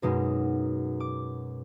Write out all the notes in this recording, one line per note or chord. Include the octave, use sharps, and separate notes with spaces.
F#2 B2 G#3 D#4
D6